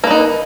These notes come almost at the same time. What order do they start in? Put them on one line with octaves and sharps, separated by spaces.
A#3 B4 D#4